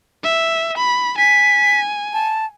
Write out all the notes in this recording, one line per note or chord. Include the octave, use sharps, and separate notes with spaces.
E5
B5
G#5 B6
A5